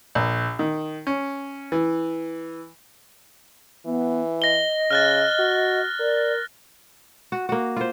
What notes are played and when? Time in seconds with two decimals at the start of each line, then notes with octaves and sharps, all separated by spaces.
0.15 A#1
0.59 D#3
1.07 C#4
1.72 E3
3.86 E3 B3
4.42 D#5 A#6 G7
4.91 C#3 F6 F#6 A6
5.39 F#4
6.00 A#4 D5
7.32 F#4
7.49 A#3 F#4
7.77 F4 C5